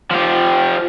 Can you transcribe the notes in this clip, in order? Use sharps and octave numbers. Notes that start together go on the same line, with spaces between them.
F3 G4